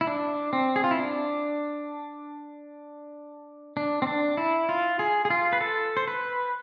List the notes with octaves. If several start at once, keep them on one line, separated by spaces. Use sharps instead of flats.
E4
D4
C4
G#4
F4
E4
D4
D4
C4
D4
E4
F4
G#4
G#4
F4
B4
A4
C5
B4